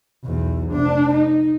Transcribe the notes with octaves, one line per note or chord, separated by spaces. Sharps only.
B1 E2
F1 D4
D#4